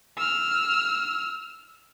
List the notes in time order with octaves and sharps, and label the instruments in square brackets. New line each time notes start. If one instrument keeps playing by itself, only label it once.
[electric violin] E6 F6